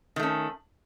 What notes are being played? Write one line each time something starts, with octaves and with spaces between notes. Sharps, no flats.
D#3 A3 C#4